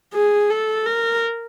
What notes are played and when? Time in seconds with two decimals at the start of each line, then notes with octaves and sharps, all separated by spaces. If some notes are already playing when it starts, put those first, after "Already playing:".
0.14 G#4
0.50 A4
0.86 A#4